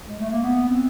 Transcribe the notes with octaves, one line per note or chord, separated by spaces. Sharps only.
G#3
A3
A#3
B3
C4